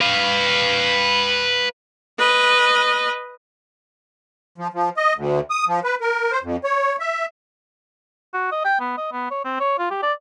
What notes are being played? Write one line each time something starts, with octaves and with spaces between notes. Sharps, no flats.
B4 F5
B4 D#5
F3
F3
D#5
D2
D#6
F3
B4
A#4
C5
F2
C#5
E5
F#4
D#5
G5
B3
D#5
B3
C#5
C4
C#5
F4
G4
D5